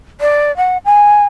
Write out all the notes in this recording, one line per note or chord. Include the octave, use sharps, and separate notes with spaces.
D5
F#5
G#5